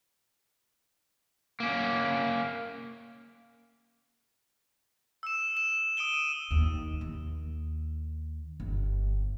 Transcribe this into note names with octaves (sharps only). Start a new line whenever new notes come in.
A#3 C#4
E6 E7
E7
D#6 D7 D#7 G7
D#7
D#2
D#2
G1